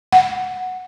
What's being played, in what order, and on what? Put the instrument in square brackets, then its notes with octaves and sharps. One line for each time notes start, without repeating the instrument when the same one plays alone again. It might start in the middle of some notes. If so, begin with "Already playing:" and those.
[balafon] F#5